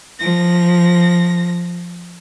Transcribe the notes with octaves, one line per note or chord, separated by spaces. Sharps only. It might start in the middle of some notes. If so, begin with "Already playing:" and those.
F3 A#6